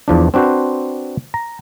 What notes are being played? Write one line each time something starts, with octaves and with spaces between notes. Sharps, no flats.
E2 F3 D4
C4 D4 F#4 B4 C5
A#5